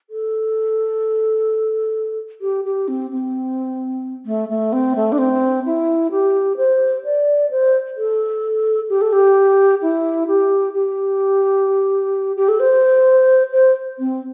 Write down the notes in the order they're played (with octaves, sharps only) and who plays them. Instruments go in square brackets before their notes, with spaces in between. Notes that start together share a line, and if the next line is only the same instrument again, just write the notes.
[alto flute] A4
G4
G4
C4
C4
A3
A3
C4
A3
D4
C4
E4
G4
C5
D5
C5
A4
G4
A4
G4
E4
G4
G4
G4
A4
C5
C5
C4